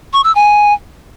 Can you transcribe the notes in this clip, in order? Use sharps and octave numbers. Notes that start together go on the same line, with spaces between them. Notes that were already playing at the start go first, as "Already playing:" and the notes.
C#6
E6
G#5